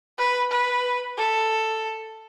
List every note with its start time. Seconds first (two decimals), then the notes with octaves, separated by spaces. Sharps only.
0.18 B4
0.51 B4
1.18 A4